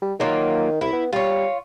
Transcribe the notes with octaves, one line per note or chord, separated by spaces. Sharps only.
G3
D#3 F#3 A#3 F4
C2 E4
B3
G3 F4 C#5